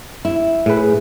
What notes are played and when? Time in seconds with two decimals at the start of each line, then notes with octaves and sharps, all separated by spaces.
0.25 E4
0.66 A2 G#4 B4